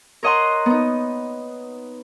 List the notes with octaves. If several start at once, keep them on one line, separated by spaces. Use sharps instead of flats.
A#4 C#5 D#5 F#5 A#5 C6
B3 D#4